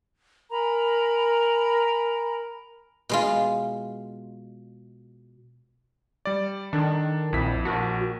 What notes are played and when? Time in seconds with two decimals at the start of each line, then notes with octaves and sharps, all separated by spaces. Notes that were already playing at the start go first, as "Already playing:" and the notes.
0.51 A#4 G#5 A#5 B5
3.09 B2 G#3 F4
6.25 G3 D5
6.73 D#3 D4 A4
7.33 A#1 F2 E4 B6
7.65 A#1 F#4 A#4 A5